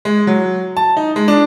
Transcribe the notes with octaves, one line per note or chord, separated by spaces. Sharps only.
G#3
F#3
A5
D#4
G#3
D4